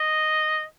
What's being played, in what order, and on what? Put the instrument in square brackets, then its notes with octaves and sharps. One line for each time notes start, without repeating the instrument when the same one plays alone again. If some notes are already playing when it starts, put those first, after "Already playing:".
Already playing: [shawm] D#5